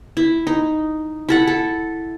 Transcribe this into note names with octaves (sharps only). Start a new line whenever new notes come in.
E4
D#4
E4 A4 F#5
A4